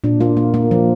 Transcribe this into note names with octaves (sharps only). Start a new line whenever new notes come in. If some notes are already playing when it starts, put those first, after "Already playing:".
A#2 D4
A#3 F4
A#3
A#3
F3